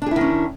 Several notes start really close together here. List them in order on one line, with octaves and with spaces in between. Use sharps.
D4 G#4 E4 D#3 C#4